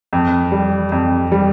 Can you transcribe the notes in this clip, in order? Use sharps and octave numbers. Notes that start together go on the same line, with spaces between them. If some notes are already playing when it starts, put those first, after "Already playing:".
F2
G3
F2
G3